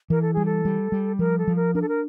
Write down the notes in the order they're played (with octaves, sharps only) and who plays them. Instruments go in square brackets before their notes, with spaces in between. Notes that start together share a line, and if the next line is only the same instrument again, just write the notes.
[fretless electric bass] E3 [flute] A#4
[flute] A4
[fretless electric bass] G3 [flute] G#4
[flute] A4
[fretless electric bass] G3
G3
[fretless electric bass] F3 [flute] A#4
[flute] A4
[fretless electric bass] F3
[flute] A#4
[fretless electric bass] D4 [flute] A#4
[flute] A4
A#4